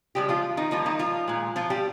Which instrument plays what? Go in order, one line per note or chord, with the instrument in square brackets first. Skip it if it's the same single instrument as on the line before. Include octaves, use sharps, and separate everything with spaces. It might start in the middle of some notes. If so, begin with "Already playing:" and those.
[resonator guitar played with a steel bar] C#3 F3 G3 G#3 G4
F3 F4
D#3 D#4
D#3 F3 G3 A#3 F4
D#3 D#4
F3 F4
A#2 G#3
F3 F4
G3 G4